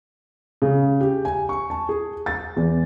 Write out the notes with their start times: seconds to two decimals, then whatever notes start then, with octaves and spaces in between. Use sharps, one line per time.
0.62 C#3
1.01 G4
1.25 G#5
1.49 C#6
1.70 A5
1.89 G#4
2.26 A6
2.56 E2